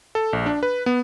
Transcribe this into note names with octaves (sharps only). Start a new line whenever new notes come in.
A4
A#1
D4
B4
B3